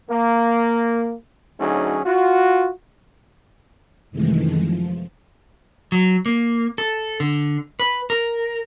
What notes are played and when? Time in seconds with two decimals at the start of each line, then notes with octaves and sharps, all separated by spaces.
0.10 A#3
1.59 D2 F#3 C#4 D#4 G#4
2.05 F4 F#4
4.11 F#2 C3 D#3 E3 G#3 A3
4.56 F3
5.92 F#3
6.26 A#3
6.78 A4
7.20 D3
7.80 B4
8.10 A#4